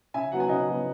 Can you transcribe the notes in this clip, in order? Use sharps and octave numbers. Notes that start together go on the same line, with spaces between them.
C#3 E5 G#5
F#3 B3 F#5
G#5
C#3 D#5 F#5
F#3 B3